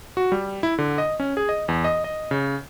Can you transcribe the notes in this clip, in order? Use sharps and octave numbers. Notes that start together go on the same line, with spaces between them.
F#4
G3
E4
D3
D#5
C#4
G#4
D#5
E2
D#5
D#5
C#3